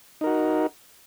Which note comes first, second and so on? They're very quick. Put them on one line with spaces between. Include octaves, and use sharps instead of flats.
D#4 A#4 F#4